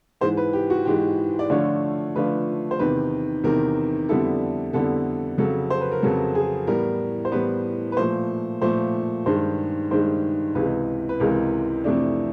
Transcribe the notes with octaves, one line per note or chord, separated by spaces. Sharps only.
G#2 E3 G#3 C5
B4
G4
F#4
G#2 E3 G#3 G4
D5
D3 F3 A3 D4 F4 C#5
D3 F3 A3 D4 F4 B4
C5
E2 C3 D#3 B4
E2 C3 D#3 A#4
F2 D3 G3 B3 E4 A4
F2 D3 G3 B3 E4 A4
F2 C#3 F#3 A4
C5
B4
A#4
F2 C#3 F#3 A4
G#4
A2 E3 G3 B3 A#4
C5
A2 E3 G3 B3 B4
B4
A#2 F3 A3 C5
A#2 F3 A3 C5
G2 D#3 G#3 C5
G2 D#3 G#3 C5
C#2 C3 E3 G#3 B4
B4
C#2 C3 E3 G#3 A#4
F2 C3 E3 A3 D4